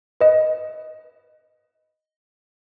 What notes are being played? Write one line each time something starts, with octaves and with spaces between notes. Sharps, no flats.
B4 D#5